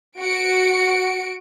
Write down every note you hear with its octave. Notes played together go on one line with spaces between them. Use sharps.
F#4 C#7 D7